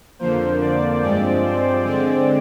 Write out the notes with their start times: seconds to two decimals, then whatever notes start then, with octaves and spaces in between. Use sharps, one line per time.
0.19 F2 D3 F3 A#3 C5
0.61 D5
1.02 G2 F3 G#3 C4 D5
1.43 C5
1.84 D3 G#3 C4 D5